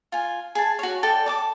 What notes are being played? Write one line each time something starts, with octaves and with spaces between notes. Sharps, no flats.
F4 G#5
G#4 A5
F#4 C#5
A4 D5 G5
D5 A5 D6